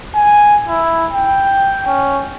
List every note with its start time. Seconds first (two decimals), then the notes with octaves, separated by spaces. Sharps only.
0.15 G#5
0.68 E4
1.12 G5
1.87 C#4